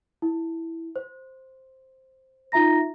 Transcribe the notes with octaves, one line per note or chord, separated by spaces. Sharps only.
E4
C5
D#4 F4 E5 A#5 A#6